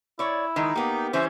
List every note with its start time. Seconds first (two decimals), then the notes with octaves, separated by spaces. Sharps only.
0.19 E4 C#5 D5
0.56 D#3 E3 G#3 D#4
0.75 A#3 B3 G4
1.13 E3 G3 C#4 C5 E5